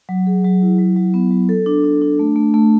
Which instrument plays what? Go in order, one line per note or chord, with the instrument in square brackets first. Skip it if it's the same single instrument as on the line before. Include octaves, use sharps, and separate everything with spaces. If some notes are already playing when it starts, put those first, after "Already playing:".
[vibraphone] F#3
G#4
F#3
E4
F#3
F#3
B3
F#3
A4
D4
D4
D4
A3
A3
A3